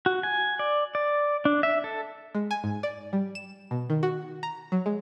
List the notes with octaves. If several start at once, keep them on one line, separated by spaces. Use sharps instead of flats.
F#4
G#5
D5
D5
D4
E5
A4
G#3
G#5
G#2
D5
G3
E7
B2
D#3
F#4
A#5
F#3
G#3